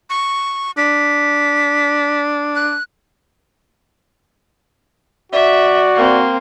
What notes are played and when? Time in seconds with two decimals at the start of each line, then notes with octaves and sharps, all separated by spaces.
0.10 C#6
0.77 D4 B6
2.55 F#6
5.32 F#4 D5 E5
5.95 A#3 C4